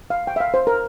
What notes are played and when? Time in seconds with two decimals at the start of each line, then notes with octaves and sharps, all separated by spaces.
0.10 F5
0.27 G5
0.36 E5
0.40 F5
0.54 C5
0.67 A#4